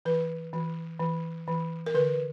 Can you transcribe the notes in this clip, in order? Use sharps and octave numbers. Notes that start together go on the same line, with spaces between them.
E3 B4
E3
E3
E3
A#4
D3 B4